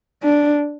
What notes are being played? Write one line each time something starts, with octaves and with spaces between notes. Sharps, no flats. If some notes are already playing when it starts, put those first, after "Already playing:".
D4